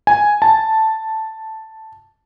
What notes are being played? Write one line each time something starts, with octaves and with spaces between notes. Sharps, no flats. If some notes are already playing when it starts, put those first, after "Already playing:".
G#5
A5